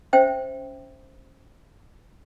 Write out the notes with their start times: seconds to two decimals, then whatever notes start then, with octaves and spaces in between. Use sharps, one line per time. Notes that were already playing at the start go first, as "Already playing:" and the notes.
0.13 C#4 C5 E5 G5